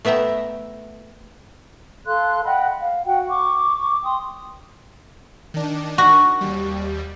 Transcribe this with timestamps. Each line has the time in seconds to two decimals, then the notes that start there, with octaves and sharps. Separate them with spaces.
0.05 A3 B3 E5 G5 A#5
2.06 A4 F5 C6 F#6
2.44 D#5 F#5 G5 B5
2.80 F5
3.06 F#4 F#5 G5
3.28 C#6 D6
4.04 G5 C6 D#6
5.54 D#3 D4
5.98 F#4
6.41 D#2 G3